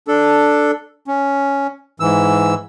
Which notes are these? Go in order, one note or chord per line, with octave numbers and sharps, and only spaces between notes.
D4 A4
C#4
G#2 E3 E6